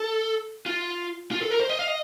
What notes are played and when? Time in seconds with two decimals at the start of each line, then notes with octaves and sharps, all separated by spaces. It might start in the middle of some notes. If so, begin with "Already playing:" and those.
Already playing: A4
0.66 F4
1.31 F4
1.42 A4
1.50 A#4
1.60 C5
1.69 D#5
1.79 F5
1.88 D#5